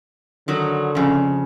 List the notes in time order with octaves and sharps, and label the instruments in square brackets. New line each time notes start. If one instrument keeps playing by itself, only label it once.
[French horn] D3 [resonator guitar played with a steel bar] D#3 F#3
[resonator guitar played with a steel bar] F2 C#3